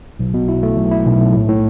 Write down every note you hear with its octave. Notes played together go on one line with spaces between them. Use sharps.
B1
B2
E4
A3
B1
E4
B1
B1
A2
A2